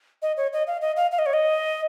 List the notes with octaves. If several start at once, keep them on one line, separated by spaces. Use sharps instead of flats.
D#5
C#5
D#5
F5
D#5
F5
F5
D#5
C#5
D#5